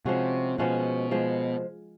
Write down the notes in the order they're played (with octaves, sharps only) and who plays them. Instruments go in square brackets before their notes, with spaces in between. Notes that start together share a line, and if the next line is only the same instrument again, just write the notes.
[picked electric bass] C3 [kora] F3 G#3 C#4 F#4
[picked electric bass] B2 [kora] F3 G#3 C#4 F#4
[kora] F3 G#3